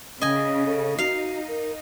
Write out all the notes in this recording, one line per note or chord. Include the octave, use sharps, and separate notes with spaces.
C#3 C#4 D#5 G#5
A4
D#4 F#4 F5
A#4